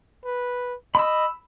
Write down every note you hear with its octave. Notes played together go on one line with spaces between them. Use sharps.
B4
D#5 B5 E6